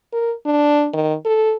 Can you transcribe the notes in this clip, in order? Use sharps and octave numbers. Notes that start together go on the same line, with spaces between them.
A#4
D4
D#3
A4